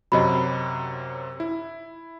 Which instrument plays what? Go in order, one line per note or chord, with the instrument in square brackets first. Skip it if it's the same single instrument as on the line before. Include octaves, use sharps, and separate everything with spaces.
[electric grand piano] F#2 C3 F#3 [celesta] D#5 B5
[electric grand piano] E4